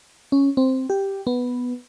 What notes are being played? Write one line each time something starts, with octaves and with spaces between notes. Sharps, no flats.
C#4
C4
G4
B3